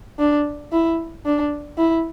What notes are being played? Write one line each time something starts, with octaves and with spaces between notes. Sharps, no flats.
D4
E4
D4
E4